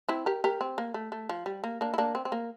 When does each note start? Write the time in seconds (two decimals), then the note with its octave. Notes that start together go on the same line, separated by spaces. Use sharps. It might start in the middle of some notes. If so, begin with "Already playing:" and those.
0.09 C4 E4
0.26 G4 A#4
0.44 G4 A#4
0.61 C4
0.78 A#3
0.94 A3
1.12 A3
1.29 F3
1.46 G3
1.64 A#3
1.81 A#3 D4
1.94 E4
1.98 A#3 D4
2.15 C4
2.25 C4
2.32 A#3